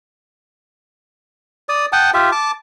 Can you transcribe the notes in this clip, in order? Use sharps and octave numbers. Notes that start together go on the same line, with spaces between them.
D5 D#6
F#5 G5 A5 D#6
F4 G4 E5
A5 D6